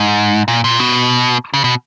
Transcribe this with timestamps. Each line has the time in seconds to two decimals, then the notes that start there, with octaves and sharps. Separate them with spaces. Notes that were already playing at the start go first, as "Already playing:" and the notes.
Already playing: G#2
0.48 A#2
0.64 A#2
0.80 B2
1.54 C#3
1.64 B2